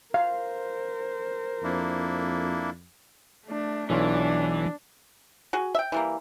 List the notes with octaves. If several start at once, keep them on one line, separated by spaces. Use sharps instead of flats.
A#4 C5 F5
F2 A#3 D4 E4
A3 D4
B1 E3 C#4 D4 F4
F#4 G#4
E5 G5
E3 G3 A#3